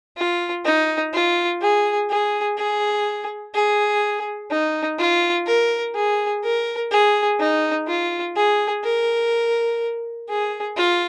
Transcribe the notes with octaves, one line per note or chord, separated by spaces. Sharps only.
F4
D#4
F4
G#4
G#4
G#4
G#4
D#4
F4
A#4
G#4
A#4
G#4
D#4
F4
G#4
A#4
G#4
F4